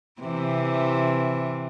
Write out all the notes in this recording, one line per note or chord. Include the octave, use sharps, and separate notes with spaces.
C3 E3